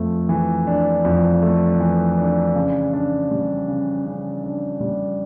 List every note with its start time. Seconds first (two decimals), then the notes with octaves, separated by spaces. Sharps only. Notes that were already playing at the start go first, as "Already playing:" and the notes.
Already playing: F2 A3
0.29 E3
0.67 D4
1.05 F2
1.42 A3
1.80 E3
2.17 D4
2.55 C#3
2.93 D4
3.31 G3
3.68 C#3
4.06 C#3
4.43 D4
4.80 G3